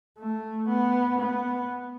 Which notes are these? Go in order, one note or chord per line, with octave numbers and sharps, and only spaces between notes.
A3
B3
B3